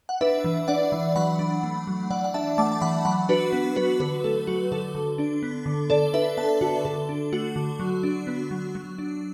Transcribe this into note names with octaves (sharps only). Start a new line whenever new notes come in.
F#5
D4 B4 E5
E3
D4 D5 F#5
E3
F#3 F#5 B5
D4
A3
F#3
E3 D5 F#5
F#5
D4 E5 A5
A3 A5 D6
A5
E3 F#5 B5
F#3 F#5 B5
D4 F#4 B4
B3
F#3 F#4 B4
D3 F#4 B4
A3 A4
F#3 F#4
D3 A4
D3
D4
B3
D3
D3 A4 D5
D4 B4 E5
B3 E5 A5
D3 F#4
D3 A4
D4
A3 F#4
D3
F#3
D4
B3
F#3
F#3
D4